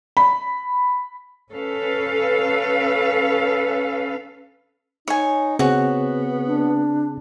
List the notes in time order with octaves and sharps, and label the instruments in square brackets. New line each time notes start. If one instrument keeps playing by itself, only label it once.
[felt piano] B5
[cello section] C#4 A4 B4 F5
[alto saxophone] D#4 [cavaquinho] C#5 G#5
[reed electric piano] C#3 C4 G#4 [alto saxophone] B3 [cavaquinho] F#4 C#5
[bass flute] D4